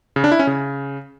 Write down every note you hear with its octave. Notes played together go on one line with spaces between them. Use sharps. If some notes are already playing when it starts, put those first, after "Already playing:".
C#3
D4
E4
C#4
C#3